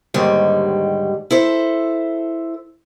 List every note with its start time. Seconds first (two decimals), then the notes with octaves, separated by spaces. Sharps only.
0.14 D#2 G#2 D3 D#3 G3
1.31 E4 A4 C5